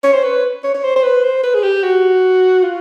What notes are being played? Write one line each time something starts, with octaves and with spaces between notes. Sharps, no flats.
C#5
C5
B4
C#5
C#5
C5
C5
B4
C5
B4
G#4
G4
F#4
F4